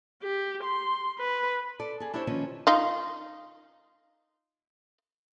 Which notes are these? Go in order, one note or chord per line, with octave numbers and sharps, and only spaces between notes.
G4
C6
B4
A4 D5
G#4 A4
D4 E4 G4 C5 C#5
D#3 F3 A#3 C#4 B4
D#4 F4